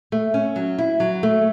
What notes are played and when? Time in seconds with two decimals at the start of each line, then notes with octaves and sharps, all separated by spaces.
0.12 A3
0.34 C#4
0.56 F#3
0.78 E4
1.00 F#3
1.23 A3